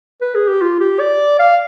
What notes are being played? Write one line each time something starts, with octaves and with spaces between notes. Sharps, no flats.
B4
G#4
G4
F4
G4
D5
F5